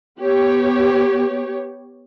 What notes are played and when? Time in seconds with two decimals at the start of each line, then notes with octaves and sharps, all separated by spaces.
0.21 B3 G4 C#5